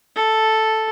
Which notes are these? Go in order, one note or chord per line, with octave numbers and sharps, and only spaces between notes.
A4